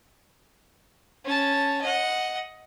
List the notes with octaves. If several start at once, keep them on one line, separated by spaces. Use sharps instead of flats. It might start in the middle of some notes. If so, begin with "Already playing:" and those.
C#4 A5
D#5 F#5